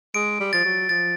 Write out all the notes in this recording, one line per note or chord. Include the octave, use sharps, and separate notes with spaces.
G#3 D7
G3
F3 A6
F#3
F3 A6